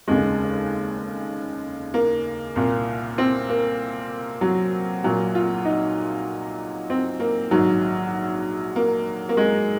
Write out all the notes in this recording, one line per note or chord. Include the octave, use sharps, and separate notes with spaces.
F1 D#2 C#3 G#3
A#3
C2 A#2
C4
A#3
F#3
A#1 A#2 F#3
F4
D#4
C4
A#3
A#1 G#2 D#3 F#3
A#3
A#3
G#3